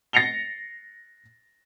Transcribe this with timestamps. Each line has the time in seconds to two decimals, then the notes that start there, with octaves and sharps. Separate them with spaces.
0.13 A6 A#6 C7 C#7 F7 G7